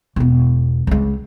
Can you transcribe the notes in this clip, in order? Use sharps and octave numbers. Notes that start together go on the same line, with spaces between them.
E1 B3
C#2 G#3